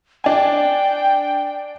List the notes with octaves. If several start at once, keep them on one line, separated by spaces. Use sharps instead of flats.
D4 G5 G#5